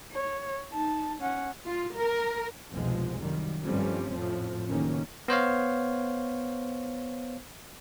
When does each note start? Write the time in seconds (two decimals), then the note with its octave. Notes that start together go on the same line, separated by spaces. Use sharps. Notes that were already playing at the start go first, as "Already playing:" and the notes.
0.12 C#5
0.72 D#4 A5
1.20 C#4 F#5
1.66 F4
1.96 A#4
2.71 F1 C2 B2 F3 G#3
3.19 F#2 D#3 G3
3.63 G2 F3 G3 A3 C4 C#4
4.10 F2 A2 F3
4.67 F#1 D3 D#3 A#3 C#4
5.28 B3 C5 C#5 F5